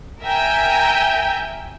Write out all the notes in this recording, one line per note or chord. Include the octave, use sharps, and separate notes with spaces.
A#4 E5 G5 G#5 A#5